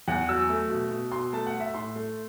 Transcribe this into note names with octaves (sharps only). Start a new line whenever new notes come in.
E2 F#5
F#3 E6
A3
B2
B2
B2 C6
A3 A5
F#5
A3
E5
A2 C6
A3